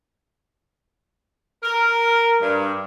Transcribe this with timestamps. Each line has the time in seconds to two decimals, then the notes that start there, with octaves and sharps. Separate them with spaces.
1.63 A#4
2.41 G2